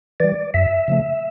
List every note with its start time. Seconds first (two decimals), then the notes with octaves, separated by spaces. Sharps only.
0.20 E3 G3 D5
0.54 F#2 E5
0.88 C#3 F3 A3